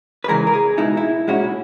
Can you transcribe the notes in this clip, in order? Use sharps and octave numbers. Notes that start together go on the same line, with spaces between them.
B4
C#3 E3 G#3 A#4
A#4
G#4
B2 G#3 D#4 E4
E4
A#2 G#3 C#4 E4 F#4